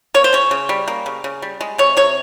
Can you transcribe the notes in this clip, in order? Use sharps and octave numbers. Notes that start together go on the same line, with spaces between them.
A#3 C#5
C5
C#3 C#5
C#3
G3
A#3
C#3
C#3
G3
G#3
C3 C#5
C3 C#5